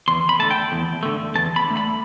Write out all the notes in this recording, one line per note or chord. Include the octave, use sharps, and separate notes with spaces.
E2 C6
B5
D3 A3 A5
G5
E2
D3 A3
E2 A5
B5
D3 A3
B5